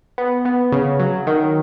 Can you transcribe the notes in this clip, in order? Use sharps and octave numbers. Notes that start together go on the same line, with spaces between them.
B3
B3
C#3
F#3
D#3